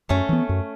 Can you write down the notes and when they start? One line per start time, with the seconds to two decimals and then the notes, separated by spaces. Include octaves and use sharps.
0.09 F#2 A3 C#4
0.29 E3 B3
0.49 F#2